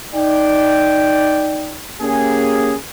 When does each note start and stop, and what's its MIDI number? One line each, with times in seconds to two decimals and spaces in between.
0.15 1.80 63
0.15 1.80 74
0.15 1.80 79
2.02 2.75 58
2.02 2.75 61
2.02 2.75 67
2.02 2.75 68